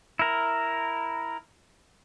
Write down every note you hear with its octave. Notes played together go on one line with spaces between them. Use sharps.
E4 A#4